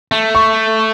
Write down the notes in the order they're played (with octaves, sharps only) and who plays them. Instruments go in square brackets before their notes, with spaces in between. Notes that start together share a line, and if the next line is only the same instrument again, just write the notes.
[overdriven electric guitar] A3
[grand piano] C#6